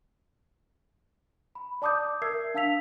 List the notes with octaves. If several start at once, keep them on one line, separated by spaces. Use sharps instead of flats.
B5
D5 A5 D6 D#6 G6
A#4 E5 E6 G#6 C7
D4 F5 A5 E6 B6 F7